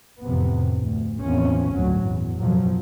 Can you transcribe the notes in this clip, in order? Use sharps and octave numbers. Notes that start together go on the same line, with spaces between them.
A1 F2 C3 B3
D2
E2 A2 D#3 F3 C4 C#4
G1 D2 A2 F#3
E2
F#2 B2 F3 F#3